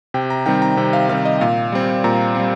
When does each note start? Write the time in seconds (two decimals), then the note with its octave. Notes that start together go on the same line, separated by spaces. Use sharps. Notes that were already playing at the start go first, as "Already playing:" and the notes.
0.14 C3 G5
0.30 A#5
0.46 D#3 G3 C4 G5
0.62 A#5
0.77 C3 G5
0.93 F5
1.09 D#3 G3 C4 F5
1.25 D#5
1.41 A#2 F5
1.72 G3 C4
2.04 A#2 A#5
2.35 G3 C4